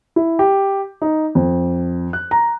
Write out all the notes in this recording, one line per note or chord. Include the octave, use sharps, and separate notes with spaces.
E4
G4
D#4
F2
F#6
A#5